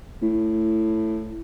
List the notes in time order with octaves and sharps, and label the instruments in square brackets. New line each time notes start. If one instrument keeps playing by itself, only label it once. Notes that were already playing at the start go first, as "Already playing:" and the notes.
[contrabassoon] A2